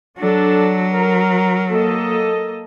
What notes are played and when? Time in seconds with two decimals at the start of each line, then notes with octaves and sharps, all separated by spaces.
0.18 F#3 D4 A4
0.94 A#4
1.69 A#3 A4 D#5